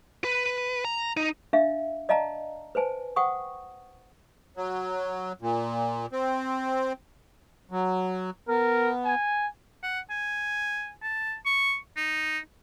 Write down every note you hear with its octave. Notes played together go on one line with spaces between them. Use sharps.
B4
A#5
D#4
D4 E5 F5
D5 D#5 F5 A5 A#5
B4 C5 G#5 A5
C5 F#5 G5 C#6 D#6
F#3
A#2
C4
F#3
B3 A#4
G#5
F#5
G#5
A5
C#6
D#4